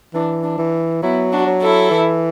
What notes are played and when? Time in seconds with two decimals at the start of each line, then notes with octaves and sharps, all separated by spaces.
0.14 E3 D4
0.43 D4
0.58 E3
1.02 F#3 B3 E4
1.32 D4 F#4
1.47 F#3
1.61 E4 A4
1.91 E3